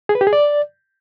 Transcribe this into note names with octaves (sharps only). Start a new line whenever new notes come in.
G#4
B4
G4
G#4
D5